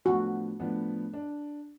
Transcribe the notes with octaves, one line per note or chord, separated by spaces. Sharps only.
A2 F3 B3 D4 F#4
A2 F3 B3 D4
D4